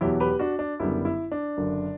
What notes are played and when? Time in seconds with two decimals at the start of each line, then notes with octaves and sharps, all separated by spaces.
0.01 E2 B2 F#3 B3 E4 G4
0.20 G4 B4
0.39 D4 F#4
0.59 D4
0.79 F#1 F#2 D3 G3 B3 E4
1.05 E4
1.32 D4
1.57 F#1 F#2 D3